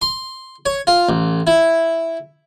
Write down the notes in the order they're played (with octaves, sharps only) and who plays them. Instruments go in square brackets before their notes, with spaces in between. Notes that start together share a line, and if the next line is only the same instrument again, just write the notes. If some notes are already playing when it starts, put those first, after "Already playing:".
[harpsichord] C6
C#5
F4
A1
E4